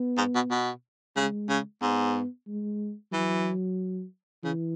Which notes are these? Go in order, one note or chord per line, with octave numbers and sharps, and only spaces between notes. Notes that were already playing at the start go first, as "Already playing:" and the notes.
Already playing: B3
G#2
B2
B2
C#3 G#3
C#3
G#2 B3
G#3
E3 F#3
C#3 E3